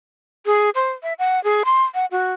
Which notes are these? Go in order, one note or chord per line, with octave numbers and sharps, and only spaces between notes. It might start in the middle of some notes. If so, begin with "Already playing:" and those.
G#4
C5
E5
F#5
G#4
C6
F#5
F#4